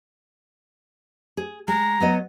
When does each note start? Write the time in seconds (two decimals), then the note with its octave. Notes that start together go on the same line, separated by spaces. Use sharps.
1.37 G#4
1.68 G#3 A#5
2.00 F#3 B3 D#5